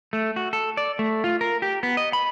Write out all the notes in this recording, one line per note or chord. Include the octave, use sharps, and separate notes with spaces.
A3
F#4
A4
D5
A3
F4
A#4
G4
B3
D#5
B5